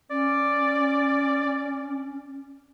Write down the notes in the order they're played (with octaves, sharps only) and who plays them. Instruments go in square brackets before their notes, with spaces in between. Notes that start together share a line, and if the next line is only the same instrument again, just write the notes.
[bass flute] C#4 [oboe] D5